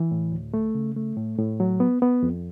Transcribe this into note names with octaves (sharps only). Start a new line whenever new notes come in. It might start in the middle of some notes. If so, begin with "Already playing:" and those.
Already playing: E3
A2
D2
A3
C#3
A3
A2
A2
F#3
B3
B3
F2